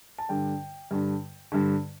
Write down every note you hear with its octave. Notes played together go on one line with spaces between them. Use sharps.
A5
G2 D3 G5
G2 D3
G2 D3